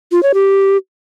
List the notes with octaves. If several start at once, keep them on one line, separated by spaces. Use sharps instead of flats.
F4
C#5
G4